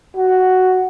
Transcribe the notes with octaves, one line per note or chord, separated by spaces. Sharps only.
F#4